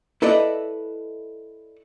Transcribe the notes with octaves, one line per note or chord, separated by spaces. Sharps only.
E4 A4 B4 D5 D#5